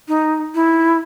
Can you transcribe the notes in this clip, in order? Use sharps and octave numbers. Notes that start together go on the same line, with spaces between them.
D#4
E4